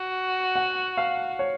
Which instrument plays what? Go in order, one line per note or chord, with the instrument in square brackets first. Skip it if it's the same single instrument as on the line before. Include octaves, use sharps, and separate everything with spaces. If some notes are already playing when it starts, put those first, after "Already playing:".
Already playing: [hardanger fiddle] F#4
[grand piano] F#5
F5
C#5